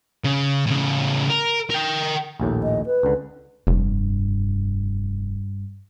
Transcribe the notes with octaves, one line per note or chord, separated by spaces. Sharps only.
C#3
A2 C#3
A#4
A#4 G5
A#1 D#2 A2
D#5
B4
C#2 D3
F1 G2